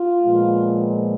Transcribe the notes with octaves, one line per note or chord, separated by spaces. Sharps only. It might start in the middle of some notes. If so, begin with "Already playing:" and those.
Already playing: F4
A#2 F3 G#3 B3